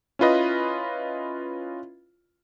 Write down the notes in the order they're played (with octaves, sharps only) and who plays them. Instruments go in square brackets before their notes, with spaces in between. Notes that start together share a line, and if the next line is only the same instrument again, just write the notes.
[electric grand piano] C#4 E4 F4 B4 D#5